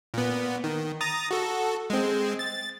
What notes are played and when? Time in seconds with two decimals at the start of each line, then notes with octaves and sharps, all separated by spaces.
0.14 A#2 B3
0.64 D#3
1.01 A#5 D#6 A6
1.31 F#4 A4
1.90 G#3 C4
2.39 A6